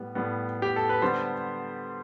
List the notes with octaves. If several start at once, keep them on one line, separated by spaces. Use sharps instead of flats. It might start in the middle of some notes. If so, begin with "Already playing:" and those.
Already playing: A2 G3 B3
A2 G3 B3
G4
A4
B4
D3 G3 B3 C5